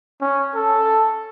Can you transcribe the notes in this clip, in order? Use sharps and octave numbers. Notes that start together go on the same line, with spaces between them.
C#4
A4